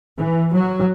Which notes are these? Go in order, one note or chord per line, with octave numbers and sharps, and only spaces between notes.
E3
F#3